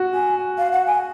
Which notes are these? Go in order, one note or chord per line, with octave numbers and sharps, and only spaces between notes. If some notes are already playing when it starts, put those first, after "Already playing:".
Already playing: F#4
G#5
F5
F#5
G#5